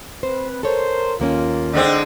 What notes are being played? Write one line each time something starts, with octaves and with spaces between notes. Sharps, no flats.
C4 B4 C5
A4 A#4 C5 C#5
D#2 A#3 C#4 F4
D3 G#3 C4 D#4 E4 D#5